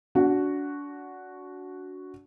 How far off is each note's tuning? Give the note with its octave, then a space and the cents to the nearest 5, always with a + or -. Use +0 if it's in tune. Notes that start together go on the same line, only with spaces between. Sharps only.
D4 -30 F#4 +0